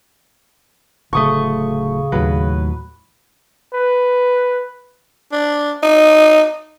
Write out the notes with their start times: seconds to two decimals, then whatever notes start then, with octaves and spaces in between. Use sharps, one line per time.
1.13 D1 D2 C#3 A3 C#6 D#6
2.12 D#2 A2 F#3 B4
3.74 B4
5.32 D4
5.83 D#4